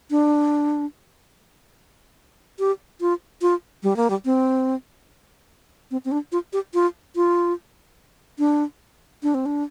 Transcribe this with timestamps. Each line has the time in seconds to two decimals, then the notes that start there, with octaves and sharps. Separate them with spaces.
0.11 D4
2.59 G4
3.01 F4
3.42 F4
3.83 G3
3.97 A#3
4.10 G3
4.25 C4
5.91 C4
6.05 C4
6.12 D4
6.32 F4
6.53 G4
6.74 F4
7.16 F4
8.39 D4
9.23 D4
9.34 C4
9.46 D4